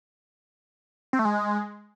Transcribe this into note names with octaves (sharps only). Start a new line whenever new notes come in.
C4
A3
G#3